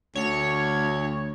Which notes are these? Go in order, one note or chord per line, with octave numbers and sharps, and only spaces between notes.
D2 C#5